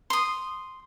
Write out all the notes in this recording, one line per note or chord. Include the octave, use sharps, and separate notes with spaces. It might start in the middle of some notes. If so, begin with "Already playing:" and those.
C6 D#6